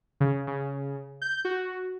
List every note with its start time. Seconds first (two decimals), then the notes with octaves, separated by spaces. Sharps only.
0.20 C#3
0.47 C#3
1.22 G6
1.45 F#4